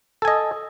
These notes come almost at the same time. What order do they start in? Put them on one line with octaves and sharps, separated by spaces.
A4 G#5 D#5